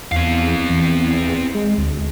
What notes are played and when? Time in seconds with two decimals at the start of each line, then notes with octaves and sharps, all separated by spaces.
0.12 E2 C4 F5
0.70 E2
1.55 G#3
1.78 D2